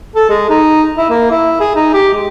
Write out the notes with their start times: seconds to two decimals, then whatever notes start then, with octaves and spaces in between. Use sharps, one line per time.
0.16 A4
0.30 G#3
0.50 D#4
0.98 E4
1.10 A#3
1.31 E4
1.60 G#4
1.75 D#4
1.93 G4
2.14 G#3